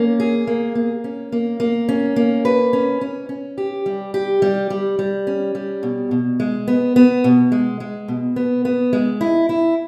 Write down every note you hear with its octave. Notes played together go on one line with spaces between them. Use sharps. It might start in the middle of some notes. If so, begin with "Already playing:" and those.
Already playing: A#3 C#4
G#4
A#3
A#3
C#4
A#3
A#3
C#4
A#3
B4
C#4
C#4
C#4
G4
G3
G4
G3
G3
G3
C#4
G3
B2
B2
G#3
B3
B3
B2
G#3
G#3
B2
B3
B3
G#3
E4
E4